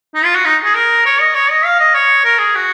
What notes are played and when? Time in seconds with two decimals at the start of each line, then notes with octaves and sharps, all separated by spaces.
0.15 D#4
0.25 F4
0.35 F#4
0.45 D#4
0.65 G#4
0.75 A#4
1.06 C#5
1.21 D#5
1.35 C#5
1.51 D#5
1.65 F5
1.80 D#5
1.95 C#5
2.25 A#4
2.39 G#4
2.55 F#4